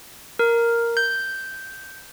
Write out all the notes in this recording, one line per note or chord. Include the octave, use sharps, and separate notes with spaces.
A#4
G6